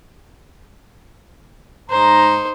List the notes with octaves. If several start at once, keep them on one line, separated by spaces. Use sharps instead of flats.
G#2 D#4 C5 A#5